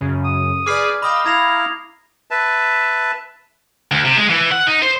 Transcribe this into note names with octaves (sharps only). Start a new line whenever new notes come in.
F#2 C#3
D#6
G#4 B4 D5 D6 F6 C7
D#5 F5 G5 B5 D#6 E6
E4 F5 A#5 G#6 A#6 F7
B4 E5 A5
D2
C3
G#3
E3
F#5
D#4
C5